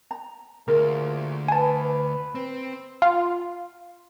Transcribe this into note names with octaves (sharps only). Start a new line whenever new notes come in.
A#5
D2 A#2 F4 G#4 A#4
B4 G#5 A5
C4
F4